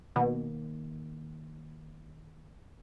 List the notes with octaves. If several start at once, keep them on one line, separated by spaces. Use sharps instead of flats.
B2 D#3 A#3